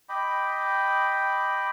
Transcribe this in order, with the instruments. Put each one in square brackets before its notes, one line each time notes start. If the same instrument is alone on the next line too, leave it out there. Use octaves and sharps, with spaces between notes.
[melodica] D#5 G5 B5 D6